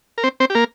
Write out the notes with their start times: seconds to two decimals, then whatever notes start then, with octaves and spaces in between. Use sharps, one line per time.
0.18 A#4
0.24 C4 C5
0.40 C4 C5
0.50 G4
0.55 A#3 A#4